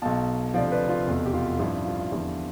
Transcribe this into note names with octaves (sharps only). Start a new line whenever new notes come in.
B1 B2 F5 A5
D2 C3 F3 D5 F5
B4 D5
F4
F1 E2 B2
G4
F4
A1 G2 F3 E4 G4
F4
E2 D3 F3 E4 G4